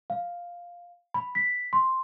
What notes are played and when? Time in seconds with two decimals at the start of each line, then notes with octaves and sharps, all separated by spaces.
0.10 F5
1.14 B5
1.35 B6
1.73 C6